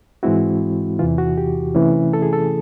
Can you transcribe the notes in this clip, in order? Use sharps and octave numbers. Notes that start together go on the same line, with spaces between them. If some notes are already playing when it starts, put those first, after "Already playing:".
G#2 E3 G#3 C4 E4 F#4
E2 C3 E3 F4
F#4
G4
C3 E3 A3 C#4 E4
A4
G#4
A4